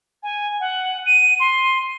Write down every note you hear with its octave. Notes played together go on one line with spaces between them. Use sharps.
G#5
F#5
D#7
C6